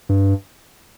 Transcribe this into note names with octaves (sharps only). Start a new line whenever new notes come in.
G2